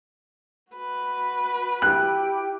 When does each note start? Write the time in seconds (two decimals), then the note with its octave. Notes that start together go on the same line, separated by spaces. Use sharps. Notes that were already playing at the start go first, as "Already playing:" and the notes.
0.72 F#4 B4
1.82 E4 G4 G5 F#6